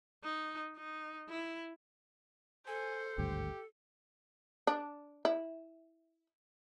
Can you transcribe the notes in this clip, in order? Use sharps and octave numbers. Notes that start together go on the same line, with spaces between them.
D#4
D#4
E4
A4 C5 G#5
G#1 D2 G2 G4
D4
E4